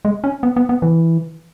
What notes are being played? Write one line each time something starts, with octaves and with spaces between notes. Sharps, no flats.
G#3
C#4
B3
B3
B3
E3